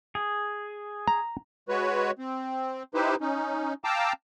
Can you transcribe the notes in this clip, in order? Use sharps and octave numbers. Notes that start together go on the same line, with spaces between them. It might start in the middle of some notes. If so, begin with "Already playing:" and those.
G#4
A#5
G#3 F#4 B4 C#5
C4
D#4 E4 G4 B4 C5
C#4 D#4
F5 G5 A5 A#5 D6 E6